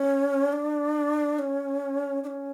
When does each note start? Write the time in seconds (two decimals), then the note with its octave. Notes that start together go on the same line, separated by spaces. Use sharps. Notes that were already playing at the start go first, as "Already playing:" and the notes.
Already playing: C#4
0.53 D4
1.39 C#4
2.24 D4
2.27 C#4